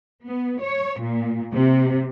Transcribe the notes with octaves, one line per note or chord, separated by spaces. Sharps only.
B3
C#5
A#2
C3